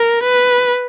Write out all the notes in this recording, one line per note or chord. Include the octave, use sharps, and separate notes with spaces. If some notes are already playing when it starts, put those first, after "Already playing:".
Already playing: A#4
B4